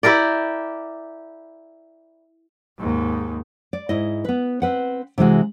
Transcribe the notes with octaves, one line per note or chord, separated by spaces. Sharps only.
E4 G4 A#4 D5
D#2 G#2
D5
G#2 E4 D#5
B3 B4
C4 B4 F#5
C3 E3 G#3 F#4